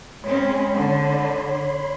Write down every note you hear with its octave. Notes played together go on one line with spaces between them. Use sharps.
G#3 C4 C#4 C#5 B5 C6
D3